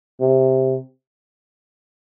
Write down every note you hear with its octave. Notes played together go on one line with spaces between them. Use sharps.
C3